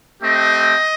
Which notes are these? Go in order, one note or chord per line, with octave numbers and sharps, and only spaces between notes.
A3 C4 G4 D#5